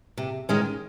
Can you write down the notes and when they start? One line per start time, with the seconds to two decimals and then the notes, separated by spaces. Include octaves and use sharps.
0.18 C3
0.49 D#3 G#3 C#4